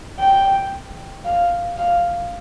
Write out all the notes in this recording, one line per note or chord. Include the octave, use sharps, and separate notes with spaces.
G5
F5
F5